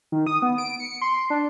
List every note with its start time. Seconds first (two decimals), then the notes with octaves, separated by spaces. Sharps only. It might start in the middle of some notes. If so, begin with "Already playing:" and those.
0.12 D#3
0.27 D#6
0.42 B3
0.58 D7
0.80 C#7
1.01 C6
1.30 D4